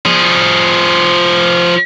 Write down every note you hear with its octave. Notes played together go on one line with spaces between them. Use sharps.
F3 G#4